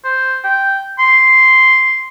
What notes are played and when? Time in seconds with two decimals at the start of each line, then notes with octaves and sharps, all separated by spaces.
0.04 C5
0.44 G5
0.99 C6